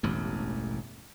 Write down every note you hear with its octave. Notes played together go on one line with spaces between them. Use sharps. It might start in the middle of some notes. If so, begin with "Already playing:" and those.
E1 A1 G2